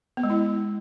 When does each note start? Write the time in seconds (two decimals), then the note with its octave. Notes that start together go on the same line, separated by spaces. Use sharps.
0.17 B3
0.23 G#3
0.30 E4